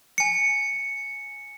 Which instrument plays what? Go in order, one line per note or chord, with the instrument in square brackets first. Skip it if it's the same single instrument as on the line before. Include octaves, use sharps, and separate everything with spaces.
[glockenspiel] G#5 C#7